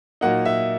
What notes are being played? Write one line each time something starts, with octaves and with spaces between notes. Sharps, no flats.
A#2 F#3 A#3 D#4 F#5
E5